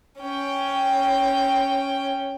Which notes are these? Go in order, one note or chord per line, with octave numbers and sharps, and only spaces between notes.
C#4 G5